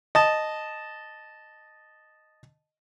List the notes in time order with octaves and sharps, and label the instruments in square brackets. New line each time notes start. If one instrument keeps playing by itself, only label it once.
[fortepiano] D#5 A5